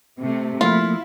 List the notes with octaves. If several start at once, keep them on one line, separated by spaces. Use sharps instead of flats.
C3 A3
F3 A3 A#3 E4 F4